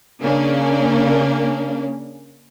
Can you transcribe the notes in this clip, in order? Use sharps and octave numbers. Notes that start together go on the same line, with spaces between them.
C#3 A#3 C#4 D4